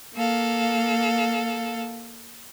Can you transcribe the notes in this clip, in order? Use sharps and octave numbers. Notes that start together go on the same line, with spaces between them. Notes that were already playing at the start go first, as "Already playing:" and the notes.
A#3 A4 F5